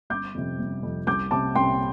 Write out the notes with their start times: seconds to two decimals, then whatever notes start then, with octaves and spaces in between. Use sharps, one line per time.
0.10 G1 D6 G6
0.35 F2 C3
0.59 G1
0.83 F2 C3
1.07 C2 D6 G6
1.31 C3 A5 D6
1.55 C2 G5 C6